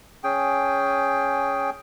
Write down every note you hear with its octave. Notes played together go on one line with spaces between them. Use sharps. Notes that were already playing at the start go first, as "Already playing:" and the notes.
C#4 G#4 G5